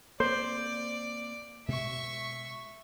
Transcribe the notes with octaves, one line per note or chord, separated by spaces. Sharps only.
A#3 C4 C5 D5
B2 G#3 E5 C#6